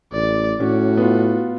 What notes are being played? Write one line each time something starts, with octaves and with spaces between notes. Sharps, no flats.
A1 D5
A2 C#4 F#4
B3 F4